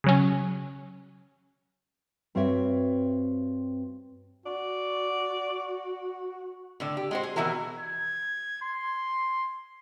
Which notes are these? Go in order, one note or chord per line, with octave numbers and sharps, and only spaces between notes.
C#3 F#3 C#4
G2 C4 F#4 C#5 E5
F#4 D5
A2 D3 D5
G4
G#3 F#4 C5
G#4
B2 D#3 E3 E4 F#4 A#4
G#6
C6